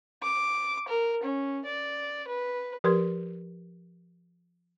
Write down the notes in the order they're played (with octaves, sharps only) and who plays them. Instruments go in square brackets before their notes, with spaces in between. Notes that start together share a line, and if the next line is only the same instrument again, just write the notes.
[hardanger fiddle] D6
A#4
C#4
D5
B4
[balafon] F3 G4 A#4 B4 C6